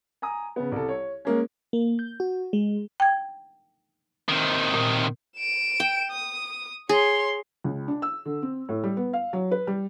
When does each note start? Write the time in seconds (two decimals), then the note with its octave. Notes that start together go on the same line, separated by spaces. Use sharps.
0.22 G#5 A#5 D#6
0.56 C#3 B3
0.72 C2 C3 A4
0.89 C#5
1.25 G#3 A#3 C#4
1.73 A#3
1.99 G6
2.20 F#4
2.53 G#3
3.00 G5 G#6
4.29 C3 D#3
4.74 A#2
5.37 D7 E7
5.80 G5
6.11 D#6
6.89 G#4 C#5 C6
7.64 C#2
7.88 D4
8.02 E6
8.25 D3
8.43 C4
8.69 A2
8.84 G3
8.97 B3
9.13 F5
9.33 F#3
9.51 B4
9.67 G3